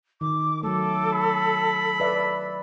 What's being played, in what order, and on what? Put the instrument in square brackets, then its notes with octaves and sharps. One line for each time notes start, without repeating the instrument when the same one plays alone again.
[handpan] D#3 [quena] D6
[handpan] F#3 A3 [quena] A4 [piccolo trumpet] D6
[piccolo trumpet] B5
[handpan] B4 D5 E5